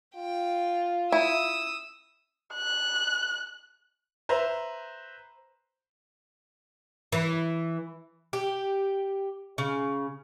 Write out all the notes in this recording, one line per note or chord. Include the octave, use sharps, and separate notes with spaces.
F4 G5
E4 D#6 E6
F#6
B4 C5 E5 A#5
E3
G4
C#3